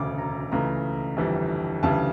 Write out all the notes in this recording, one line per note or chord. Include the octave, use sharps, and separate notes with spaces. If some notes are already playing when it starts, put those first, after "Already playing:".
Already playing: E1 D2 C#3 D6
A#5
C#2 C#3 E3 A3 A#5
G1 F2 E3 G3
D2 C#3 E3 G3 A5